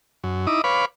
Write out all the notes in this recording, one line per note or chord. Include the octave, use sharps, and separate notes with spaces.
F#2
D#4 E4 D6 D#6
B4 C#5 F5 B5 D6